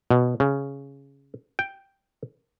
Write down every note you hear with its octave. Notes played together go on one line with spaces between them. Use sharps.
B2
C#3
G5